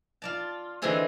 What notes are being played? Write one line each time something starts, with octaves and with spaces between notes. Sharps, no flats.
F4 D5 A5
D3 E3 G#3 C4 G#4 C6